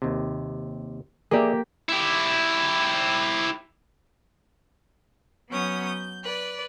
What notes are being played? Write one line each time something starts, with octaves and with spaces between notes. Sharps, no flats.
D#2 C3
A#3 G4 G#4 D5 E5
E4 G4
F#3 B3 C#4 D#6 G6
G6
B4 D5